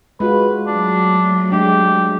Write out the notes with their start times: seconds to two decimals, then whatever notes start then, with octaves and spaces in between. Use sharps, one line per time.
0.20 G#3 F4 F#4 B4
0.67 F#3 A3 D4
1.52 G#3 D4 G4